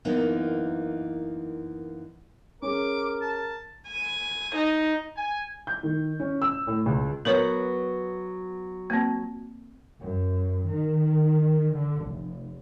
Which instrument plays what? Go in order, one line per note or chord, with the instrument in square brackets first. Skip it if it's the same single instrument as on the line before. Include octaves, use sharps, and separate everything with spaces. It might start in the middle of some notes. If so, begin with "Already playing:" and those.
[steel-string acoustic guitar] F#2 E3 A#3 B3 D#4
[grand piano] C#4 G#4 [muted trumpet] A#4 [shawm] D6
[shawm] A5
[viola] G#5
D#4
[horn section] G#5
[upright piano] G6
D#3
C#4
E6
A2
C#2
[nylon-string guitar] F#3 B3 [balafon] A#4 B4 C#5
[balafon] A#3 C4
[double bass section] F#2
D#3
D3
F1